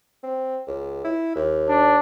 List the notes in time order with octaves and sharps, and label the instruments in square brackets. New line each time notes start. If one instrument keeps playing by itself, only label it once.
[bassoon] C4
C#2
E4
D#2
[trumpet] D4